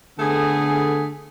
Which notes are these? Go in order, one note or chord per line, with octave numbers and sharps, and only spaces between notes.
D3 A3 B3 G#4